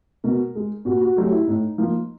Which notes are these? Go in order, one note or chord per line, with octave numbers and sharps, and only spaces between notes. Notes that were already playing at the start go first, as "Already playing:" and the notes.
B2 A#4
G#3
A#2 F#4
F#4
F#3 A3 G4
E4
A2 D#4
F3 A#3